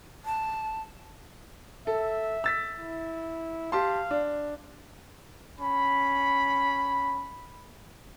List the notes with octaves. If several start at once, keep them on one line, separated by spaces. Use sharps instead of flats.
A5
A4 E5
E6 A6 B6
E4
G4 F5 A5 C6
D4
C#4 B5